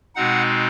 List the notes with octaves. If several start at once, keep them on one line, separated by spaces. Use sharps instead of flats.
B2 G#3 C4 D#4 F#5